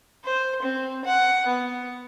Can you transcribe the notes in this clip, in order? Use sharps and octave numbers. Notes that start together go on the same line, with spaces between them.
C5
C4
F#5
B3